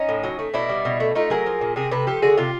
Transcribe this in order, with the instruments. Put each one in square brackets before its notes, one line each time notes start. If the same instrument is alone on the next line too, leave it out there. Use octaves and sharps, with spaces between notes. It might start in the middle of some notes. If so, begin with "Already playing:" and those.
Already playing: [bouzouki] C#4 D#4
A2
F#3
A3
B2 D4 E4
G3
B2
A3
A3 D#4 F4
F#3 G#4 A#4
F3
A#2
C3 G#4 A#4
C3 A4 B4
F3 G4 A4
D3 F#4 G#4
C3 F4 G4